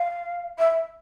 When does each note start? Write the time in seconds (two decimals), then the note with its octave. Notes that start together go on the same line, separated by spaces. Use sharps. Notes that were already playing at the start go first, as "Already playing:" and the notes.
Already playing: F5
0.59 E5